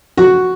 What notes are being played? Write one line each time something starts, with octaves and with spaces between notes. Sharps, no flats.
F#4